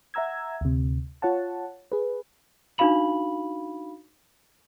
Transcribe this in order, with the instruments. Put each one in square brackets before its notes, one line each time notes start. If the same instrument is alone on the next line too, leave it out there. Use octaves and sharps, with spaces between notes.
[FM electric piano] E5 F#5 A#5 E6 G#6
D2 C3
F4 C#5 F#5 A5
G#4 B4
[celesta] D4 D#4 F#4 F5 B5 F#7